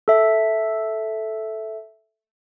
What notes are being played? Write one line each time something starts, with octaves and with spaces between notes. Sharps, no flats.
A4 E5